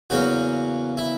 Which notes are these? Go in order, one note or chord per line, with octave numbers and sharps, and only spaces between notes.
E2 C#3 F#3 A#3 C#4 F#4
E4